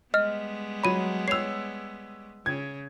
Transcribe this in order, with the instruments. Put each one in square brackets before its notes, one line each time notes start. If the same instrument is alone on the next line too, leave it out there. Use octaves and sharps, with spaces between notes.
[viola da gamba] G3 G#3 B3 [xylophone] D#5 F6
[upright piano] F#3 C#5 [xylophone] B5 D#7
[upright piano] C#5 E6 [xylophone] C7 F7
[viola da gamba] C#3 [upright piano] G#6